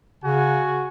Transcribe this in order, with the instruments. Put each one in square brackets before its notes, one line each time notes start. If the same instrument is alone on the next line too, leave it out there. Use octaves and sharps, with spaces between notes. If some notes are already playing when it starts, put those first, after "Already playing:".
[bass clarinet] C#3 [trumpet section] F#4 G#5